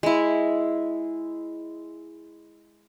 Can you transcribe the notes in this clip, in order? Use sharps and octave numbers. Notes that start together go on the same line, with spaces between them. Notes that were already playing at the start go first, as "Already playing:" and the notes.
G#3 E4